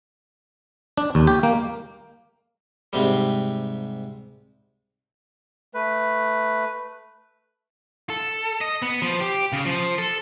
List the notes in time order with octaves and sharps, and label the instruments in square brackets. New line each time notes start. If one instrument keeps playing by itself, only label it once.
[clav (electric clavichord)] D4
D#2
G4
A#3
[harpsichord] G#2 C3 G3
[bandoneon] A3 B4
[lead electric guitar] A4
D#5
B3
F3
G4
C#3
F3
A4